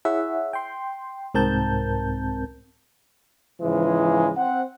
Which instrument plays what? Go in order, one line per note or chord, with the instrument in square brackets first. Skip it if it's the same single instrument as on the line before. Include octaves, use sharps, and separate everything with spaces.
[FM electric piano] E4 G#4 C#5 E5 F#5
G5 C6
C2 G#2 C4 A#4 A5 G6
[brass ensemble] G#2 C#3 E3 F3 G#3
C4 F#5